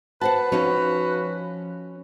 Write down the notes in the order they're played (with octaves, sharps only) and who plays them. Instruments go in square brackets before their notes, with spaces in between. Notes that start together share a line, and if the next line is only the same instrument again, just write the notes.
[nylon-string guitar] F#4 C5 F#5 [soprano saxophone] B4 [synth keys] A5
[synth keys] F3 [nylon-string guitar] C#4 D#4 C#5 [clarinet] F#4